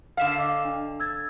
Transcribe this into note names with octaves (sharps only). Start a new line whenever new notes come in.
D3 E5 F5 F6 E7
D#5 D6
D4
E6 G#6 A6